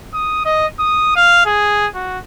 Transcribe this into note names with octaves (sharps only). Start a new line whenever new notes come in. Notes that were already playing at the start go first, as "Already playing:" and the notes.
D#6
D#5
D#6
F5
G#4
F#4